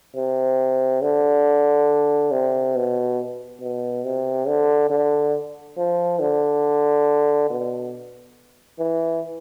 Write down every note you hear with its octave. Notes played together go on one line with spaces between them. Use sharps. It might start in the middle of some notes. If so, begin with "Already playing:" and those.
C3
D3
C3
B2
B2
C3
D3
D3
F3
D3
B2
E3